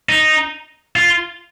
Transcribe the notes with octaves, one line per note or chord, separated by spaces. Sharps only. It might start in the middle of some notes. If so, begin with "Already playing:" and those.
D#4
F4